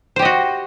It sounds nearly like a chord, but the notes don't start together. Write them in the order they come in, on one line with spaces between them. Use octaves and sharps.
C5 G4 D#5 F#4